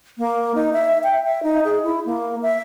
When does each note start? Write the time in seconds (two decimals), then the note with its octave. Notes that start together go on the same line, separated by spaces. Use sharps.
0.18 A#3
0.55 D#4
0.73 E5
1.04 G5
1.24 E5
1.43 D#4
1.65 G#4
1.84 E4
2.06 A#3
2.43 E5